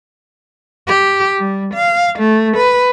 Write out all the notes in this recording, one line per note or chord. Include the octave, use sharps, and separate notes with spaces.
G4
G3
F5
A3
B4